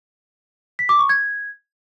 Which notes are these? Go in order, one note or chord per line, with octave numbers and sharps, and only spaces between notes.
B6
D6
C#6
G#6